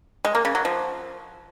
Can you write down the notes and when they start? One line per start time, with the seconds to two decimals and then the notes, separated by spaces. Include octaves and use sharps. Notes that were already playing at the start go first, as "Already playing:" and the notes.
0.25 G#3
0.35 A#3
0.45 C#3
0.55 F#3
0.65 F3